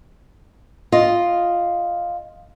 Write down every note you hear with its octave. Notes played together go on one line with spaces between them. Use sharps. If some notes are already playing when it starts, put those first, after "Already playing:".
F4 D#5